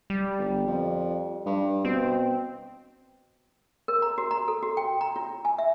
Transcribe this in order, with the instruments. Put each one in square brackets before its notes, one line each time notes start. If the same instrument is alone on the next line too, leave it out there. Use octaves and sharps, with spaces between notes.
[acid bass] G3
[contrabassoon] G1
F2
G2
[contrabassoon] B2 [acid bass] C4
[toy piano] A#4
A#5
F#4
A#5
A4
F#4
G5
A#5
F4
G#5
E5